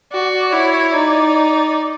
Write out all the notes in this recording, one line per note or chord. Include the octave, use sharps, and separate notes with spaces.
F#4 D5
E4 C#5
D#4 D5
D5